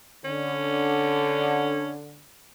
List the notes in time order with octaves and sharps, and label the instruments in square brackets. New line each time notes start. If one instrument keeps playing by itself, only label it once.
[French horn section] D3 [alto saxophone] C#4